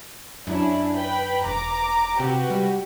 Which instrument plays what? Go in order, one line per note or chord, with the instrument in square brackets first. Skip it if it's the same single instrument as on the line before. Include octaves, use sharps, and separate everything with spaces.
[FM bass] F#2 [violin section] C#4 D4 E4
[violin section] B4 G5 B5
[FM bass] E1 [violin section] A#5 D6
[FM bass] C3 [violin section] F#4 G4 B4
[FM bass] G3